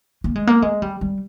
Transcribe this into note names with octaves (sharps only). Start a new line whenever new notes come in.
A#3
G#3
A#3
G#3
G3
G3